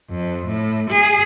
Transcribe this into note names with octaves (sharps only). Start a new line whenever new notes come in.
F2
A2
G#4